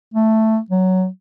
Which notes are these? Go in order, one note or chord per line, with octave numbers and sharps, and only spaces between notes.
A3
F#3